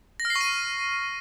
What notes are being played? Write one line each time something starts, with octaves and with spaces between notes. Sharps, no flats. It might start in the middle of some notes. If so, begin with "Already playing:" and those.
A#6
F6
C7
C#6
D#7